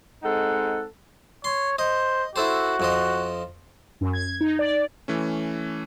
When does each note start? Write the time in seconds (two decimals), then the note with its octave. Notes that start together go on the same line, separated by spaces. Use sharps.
0.23 G#3 C4 D#4 A4 F#5
1.44 C#5 C6
1.79 C5 D#5
2.36 E4 F#4 A4 C5
2.80 F2 F3 D#5
4.01 F#2
4.13 G#6
4.41 D#4
4.59 D5
5.08 E3 A3 C#4